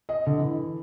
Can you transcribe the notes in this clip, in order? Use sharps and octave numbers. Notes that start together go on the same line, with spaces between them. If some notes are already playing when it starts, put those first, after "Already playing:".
D#5
D3
E3